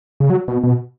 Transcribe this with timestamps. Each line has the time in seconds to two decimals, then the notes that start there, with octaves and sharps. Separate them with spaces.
0.20 C#3
0.30 F#3
0.48 B2
0.63 B2